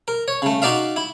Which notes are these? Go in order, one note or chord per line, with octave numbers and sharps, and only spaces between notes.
A#4
C#5
C#3 A3
D#4 F#4 D5 E5 F5
E4